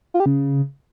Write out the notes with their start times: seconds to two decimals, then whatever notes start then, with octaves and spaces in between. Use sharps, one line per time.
0.14 F4
0.20 G4
0.26 C#3